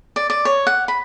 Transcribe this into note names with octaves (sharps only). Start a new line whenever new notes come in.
D5
D5
C#5
F#5
B5